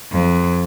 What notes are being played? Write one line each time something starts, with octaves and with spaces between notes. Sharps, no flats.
F2